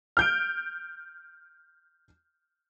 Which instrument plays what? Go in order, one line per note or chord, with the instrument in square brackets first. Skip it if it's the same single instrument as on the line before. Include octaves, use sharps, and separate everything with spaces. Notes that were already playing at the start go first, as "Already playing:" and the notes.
[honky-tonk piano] F6 G6 D7